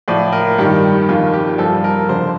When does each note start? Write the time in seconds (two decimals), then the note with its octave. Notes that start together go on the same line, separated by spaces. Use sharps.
0.08 A2 F3 D5
0.33 A#4
0.58 G2 D#3 G4
1.09 F2 D#3 F4
1.33 G4
1.58 G2 F3 A4
1.84 A#4
2.09 F2 D3 F3 C5